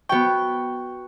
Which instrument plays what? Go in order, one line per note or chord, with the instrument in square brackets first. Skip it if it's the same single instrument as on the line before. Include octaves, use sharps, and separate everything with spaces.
[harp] B3 G5 [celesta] F#4 C#6